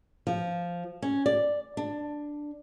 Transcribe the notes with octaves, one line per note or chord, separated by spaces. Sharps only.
F3
C#4
D5
D4